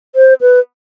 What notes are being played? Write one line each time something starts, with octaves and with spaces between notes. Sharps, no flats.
C5
B4